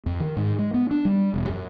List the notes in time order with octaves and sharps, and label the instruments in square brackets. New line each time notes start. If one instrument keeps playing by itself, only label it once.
[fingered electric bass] F2
D#3
G#2
G#3
B3
D4
G3
E1
F#2